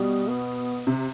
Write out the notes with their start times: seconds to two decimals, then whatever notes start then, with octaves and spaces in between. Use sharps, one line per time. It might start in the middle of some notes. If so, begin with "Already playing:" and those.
Already playing: B2 G3
0.29 B3
0.87 C3